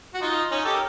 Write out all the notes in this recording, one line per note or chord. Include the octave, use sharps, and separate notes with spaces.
F#4
D#4 F4
C#4 D#4
G4 A4
A#4